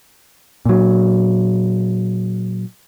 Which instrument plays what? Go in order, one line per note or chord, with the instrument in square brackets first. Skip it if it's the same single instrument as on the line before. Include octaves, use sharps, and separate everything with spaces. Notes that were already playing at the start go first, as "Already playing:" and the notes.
[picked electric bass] A#2 F#3